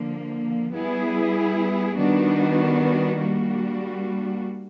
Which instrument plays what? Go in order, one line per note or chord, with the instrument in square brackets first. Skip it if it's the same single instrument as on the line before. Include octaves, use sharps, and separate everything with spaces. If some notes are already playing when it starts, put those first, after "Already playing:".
Already playing: [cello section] D3 F3 A#3
G3 B3 E4 G#4
D#3 G3 B3 D4 F#4
G3 A#3 D4 F#4